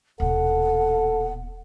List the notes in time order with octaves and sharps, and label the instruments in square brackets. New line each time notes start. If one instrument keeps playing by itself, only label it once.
[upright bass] D#1 B2 [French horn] A4 [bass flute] F#5